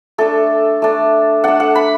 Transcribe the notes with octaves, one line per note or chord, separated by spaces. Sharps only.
A3 D4 A4
A3 D4
A3 D4 F#5
F#5
B5